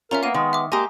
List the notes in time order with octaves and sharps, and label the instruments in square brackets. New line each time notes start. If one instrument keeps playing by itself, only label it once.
[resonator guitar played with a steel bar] C#4 F4 [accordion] A#4 [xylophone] E5 A#5
[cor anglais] A#3 [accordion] B3 [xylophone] F5 D#7
[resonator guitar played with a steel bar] D#3 [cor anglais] G#3
[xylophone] E5 D6
[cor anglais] G#3 [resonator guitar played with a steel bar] A#3 G4 [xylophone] G#5 A#5 D#6